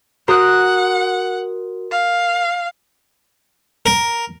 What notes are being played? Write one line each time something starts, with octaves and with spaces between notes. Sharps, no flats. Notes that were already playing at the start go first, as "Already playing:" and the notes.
F#4 A#4 F#5 D#6 F#6
F5
A#4